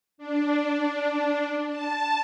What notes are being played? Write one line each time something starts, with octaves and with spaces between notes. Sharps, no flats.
D4
A5